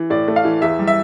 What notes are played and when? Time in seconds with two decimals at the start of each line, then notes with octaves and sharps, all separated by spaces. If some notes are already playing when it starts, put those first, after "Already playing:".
Already playing: E3
0.10 A2 D5
0.28 A3
0.36 F5
0.45 E3
0.62 E2 E5
0.79 G3
0.87 E5